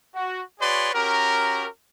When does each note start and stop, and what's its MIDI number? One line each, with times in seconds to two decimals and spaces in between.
0.14 0.42 66
0.60 0.90 66
0.60 0.90 68
0.60 0.90 71
0.60 0.90 73
0.60 0.90 74
0.60 0.90 84
0.94 1.67 61
0.94 1.67 66
0.94 1.67 67
0.94 1.67 70